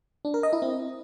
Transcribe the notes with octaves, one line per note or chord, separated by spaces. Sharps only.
D4
A#4
D#5
E4
C4